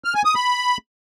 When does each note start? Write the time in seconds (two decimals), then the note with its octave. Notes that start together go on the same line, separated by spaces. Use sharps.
0.04 F6
0.15 G#5
0.25 D#6
0.35 B5